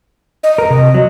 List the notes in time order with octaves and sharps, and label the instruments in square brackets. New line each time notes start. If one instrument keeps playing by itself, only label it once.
[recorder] D#5
[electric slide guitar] A#4
C3
F#3